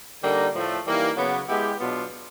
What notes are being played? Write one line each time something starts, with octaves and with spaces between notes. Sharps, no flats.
D3 G3 A#3 D#4
A2 F3 A3
E3 G3 A#3 D#4 G4
C#3 F#3 B3
G#3 B3 E4 G4
B2 F#3 B3 D4 F4